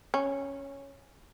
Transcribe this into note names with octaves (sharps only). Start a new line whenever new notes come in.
C#4